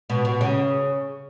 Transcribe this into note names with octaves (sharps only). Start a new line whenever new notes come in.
B2
B2
C#3